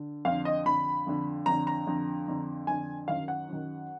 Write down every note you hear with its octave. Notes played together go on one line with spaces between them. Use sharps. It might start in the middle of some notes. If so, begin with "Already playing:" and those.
Already playing: D3
F2 D3 F5
D#5
F2 D3 B5
F2 D3
F2 D3 A#5
A#5
F2 D3
F2 D3
F2 D3 G#5
F#2 D#3 F5
F#5
F#2 D#3